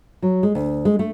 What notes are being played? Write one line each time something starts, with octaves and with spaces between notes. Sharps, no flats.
F#3
G#3
D2
G#3
A3